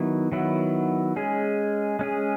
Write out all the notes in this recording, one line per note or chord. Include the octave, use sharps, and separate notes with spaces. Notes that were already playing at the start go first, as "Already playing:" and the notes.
Already playing: D#3 F#3 B3 E4
D#3 F#3 B3 E4
G#3 C#4 G#4
G#3 C#4 G#4